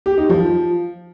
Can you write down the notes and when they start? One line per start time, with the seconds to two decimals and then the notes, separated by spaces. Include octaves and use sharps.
0.06 G4
0.18 D#4
0.29 F3